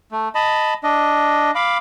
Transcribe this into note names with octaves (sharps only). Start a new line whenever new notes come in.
A3
D#5 A5 B5
D4 D#5
F5 B5 D6